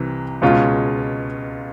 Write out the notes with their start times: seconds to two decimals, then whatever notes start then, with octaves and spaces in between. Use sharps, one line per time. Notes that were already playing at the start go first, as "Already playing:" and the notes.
Already playing: C2 C3 E3
0.42 C#2 B2 G#3 C#4 F4